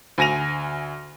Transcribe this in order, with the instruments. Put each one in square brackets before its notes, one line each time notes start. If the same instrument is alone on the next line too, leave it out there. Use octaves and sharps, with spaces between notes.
[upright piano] D2 G#5 A#6 D#7 F7